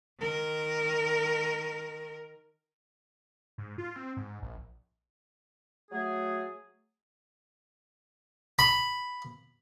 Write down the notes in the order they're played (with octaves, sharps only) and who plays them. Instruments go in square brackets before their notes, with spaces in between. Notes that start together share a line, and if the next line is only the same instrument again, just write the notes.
[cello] D#3 A#4
[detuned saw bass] G#2
F4
C4
G#2
A#1
[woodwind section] F#3 A3 G#4
[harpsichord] B5